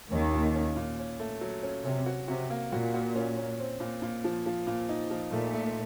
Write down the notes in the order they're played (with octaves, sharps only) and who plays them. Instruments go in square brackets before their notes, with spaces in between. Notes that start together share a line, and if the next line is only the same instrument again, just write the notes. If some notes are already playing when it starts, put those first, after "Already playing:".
[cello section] D#2 D#3 [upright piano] C#4
[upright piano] A#2
C#4
A#2
C#4
A3
F#3
C#4
[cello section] C3 [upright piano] C#4
[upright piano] F#4
[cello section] C3 [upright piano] F#4
[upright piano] A#3
[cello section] A#2 [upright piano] F#4
[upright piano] F#4
C#4
C#4
C4
A#2
A#2
F3
F3
A#2
D#4
F3
[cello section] A#2 [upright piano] A3
[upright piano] A3